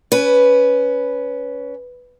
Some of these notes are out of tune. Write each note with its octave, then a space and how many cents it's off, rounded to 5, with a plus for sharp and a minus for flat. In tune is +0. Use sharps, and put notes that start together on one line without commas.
C#4 +20 B4 +0